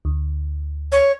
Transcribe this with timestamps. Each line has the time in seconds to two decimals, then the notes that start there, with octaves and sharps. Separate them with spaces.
0.05 D2
0.92 C#5